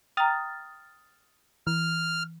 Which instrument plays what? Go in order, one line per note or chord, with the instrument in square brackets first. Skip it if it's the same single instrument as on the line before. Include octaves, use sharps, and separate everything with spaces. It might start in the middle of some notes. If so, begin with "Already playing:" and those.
[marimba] G5 A#5 [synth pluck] D#6 F6 A6
[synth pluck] E3 [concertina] F6